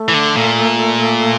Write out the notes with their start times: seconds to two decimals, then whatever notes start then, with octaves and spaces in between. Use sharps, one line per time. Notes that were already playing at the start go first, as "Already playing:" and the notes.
Already playing: A3
0.09 E3
0.14 D3
0.36 A#2